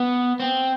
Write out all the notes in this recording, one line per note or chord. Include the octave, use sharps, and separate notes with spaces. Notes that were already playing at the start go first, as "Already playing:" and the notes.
Already playing: B3
C4